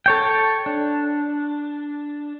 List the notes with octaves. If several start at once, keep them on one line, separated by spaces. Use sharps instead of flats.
A4 C#5 G5
D4